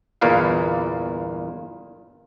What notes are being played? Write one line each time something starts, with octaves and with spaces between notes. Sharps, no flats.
G1 E2 A#2 A#3 B4 F5